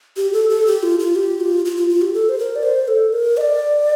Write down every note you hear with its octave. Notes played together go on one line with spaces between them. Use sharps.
G4
A4
A4
G4
F4
F4
G4
F4
F4
F4
F4
G4
A4
C5
A#4
D5
C5
A4
A#4
D#5
D5